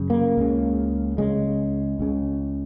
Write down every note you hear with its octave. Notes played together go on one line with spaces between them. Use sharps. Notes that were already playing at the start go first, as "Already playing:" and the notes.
Already playing: F#2 C#3
A#3
C#2 C#3
C#2 C#3 G#3
C#2 C#3